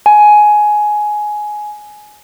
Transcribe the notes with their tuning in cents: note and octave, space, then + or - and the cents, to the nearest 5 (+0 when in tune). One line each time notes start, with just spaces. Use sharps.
G#5 +15